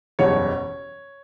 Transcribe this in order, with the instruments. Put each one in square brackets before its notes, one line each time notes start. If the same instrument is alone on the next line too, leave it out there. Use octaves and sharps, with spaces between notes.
[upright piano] F#1 E2 B2 G3 C#5